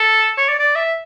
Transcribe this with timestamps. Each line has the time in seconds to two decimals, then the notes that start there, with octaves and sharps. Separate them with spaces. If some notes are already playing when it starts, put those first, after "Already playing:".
Already playing: A4
0.38 C#5
0.49 D5
0.59 D5
0.75 E5